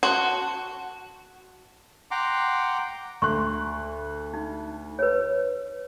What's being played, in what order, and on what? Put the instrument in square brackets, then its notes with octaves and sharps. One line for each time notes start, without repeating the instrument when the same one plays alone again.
[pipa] F#4 [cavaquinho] A5 C6
[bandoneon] F#5 G5 A#5 C6 D6
[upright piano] D2 F#6 [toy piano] C6 C#6
[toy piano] D#4
B4 C#5